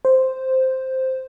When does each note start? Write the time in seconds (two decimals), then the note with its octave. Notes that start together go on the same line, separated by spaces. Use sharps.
0.05 C5